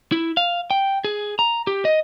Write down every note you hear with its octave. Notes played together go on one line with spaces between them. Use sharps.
E4
F5
G5
G#4
A#5
G4
D#5